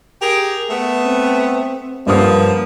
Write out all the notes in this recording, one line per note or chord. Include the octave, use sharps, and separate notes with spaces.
G4 G#4 A#4
A3 B3
C4
G2 D3 F3 A#3 B4 D#6